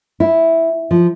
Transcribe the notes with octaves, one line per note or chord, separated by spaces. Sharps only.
E4
F3